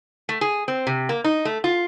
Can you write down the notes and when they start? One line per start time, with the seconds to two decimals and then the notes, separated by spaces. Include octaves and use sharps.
0.29 A3
0.41 G#4
0.68 C4
0.87 C3
1.09 A#3
1.24 D#4
1.45 A3
1.64 F4